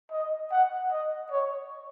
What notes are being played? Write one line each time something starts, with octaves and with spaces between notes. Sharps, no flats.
D#5
F#5
D#5
C#5